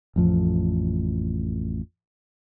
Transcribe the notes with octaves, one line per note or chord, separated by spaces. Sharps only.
A1 F2 F3